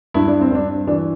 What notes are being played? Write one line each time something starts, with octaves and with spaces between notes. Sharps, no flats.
G2 E4
D4
C4
G2 D4
E3 D4